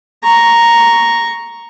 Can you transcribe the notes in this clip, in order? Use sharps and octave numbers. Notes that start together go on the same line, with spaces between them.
A#5 C#6